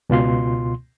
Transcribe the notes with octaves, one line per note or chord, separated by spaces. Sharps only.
C#2 B2 F4 C6